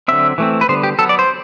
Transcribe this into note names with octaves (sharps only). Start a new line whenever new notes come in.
D3 F#3 C4 E5
E3 A3 C4
B4
D3 G3 B3 C5
G4
F#3 B3 A4
D5
C5